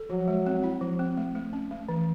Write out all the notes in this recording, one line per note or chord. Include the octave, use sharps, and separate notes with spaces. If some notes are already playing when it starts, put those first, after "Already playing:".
Already playing: A4
F3 F#3
G#3
C4
E4
F3
C4
A3
A3
C#4
A3
E3